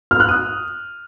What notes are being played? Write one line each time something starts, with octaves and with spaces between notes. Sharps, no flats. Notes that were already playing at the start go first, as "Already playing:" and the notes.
F6
F#6
D#6